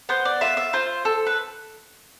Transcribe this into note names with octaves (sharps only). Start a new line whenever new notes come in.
B3 C5
D5
F4 E5
E5
F4 C5
A4
B4